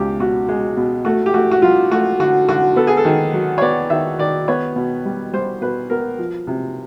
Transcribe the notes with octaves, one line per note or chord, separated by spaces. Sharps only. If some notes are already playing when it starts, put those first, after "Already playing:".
Already playing: C#2 B2 G4
B2 F#4
G#3
B2
A3 F#4
G4
A3 F#4
F#4
F#3 F4
A3 F#4
D3 F#4
D3 F#4
B3 A4
G#4
A4
D#3
F#3
C#5
B3 D5
D#3 E5
D#3 D5
B3 C#5
B2
G3
G3 C5
B2 B4
B3 A#4
F3
C3